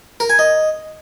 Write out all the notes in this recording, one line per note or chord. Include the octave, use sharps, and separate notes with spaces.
A#4
G#5
D#5